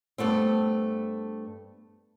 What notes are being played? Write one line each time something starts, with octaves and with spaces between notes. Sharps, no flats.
G2 A3 B3 C4